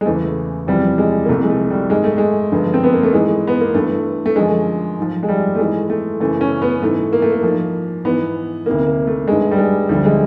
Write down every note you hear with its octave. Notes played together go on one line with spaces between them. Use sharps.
G#3
E2 C#3 E3 A3
E2 C3 F3 G3
G#3
A#3
C2 C3 F3 A3
G#3
A3
G3
G#2 D#3 G#3
A3
G#3
G2 D3 F3
C4
B3
A#3
A3
G#2 E3 G#3
B3
A#3
G2 E3 A3
A3
F#2 D3 F3 G#3
G#2 F3
G#3
G3
A3
G#2 E3 G#3
A3
F#2 C#3 E3 A3
C#4
B3
G#2 E3 A3
A#3
A3
A#3
G#2 F3
G#2 E3 B3
D2 C3 D#3 A#3
A#3
A3
G2 D#3 G#3
G3
G#3
D2 D3 F3 G3
G#3